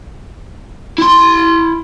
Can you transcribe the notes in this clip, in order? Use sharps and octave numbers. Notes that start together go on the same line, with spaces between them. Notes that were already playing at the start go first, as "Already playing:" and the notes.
E4 C6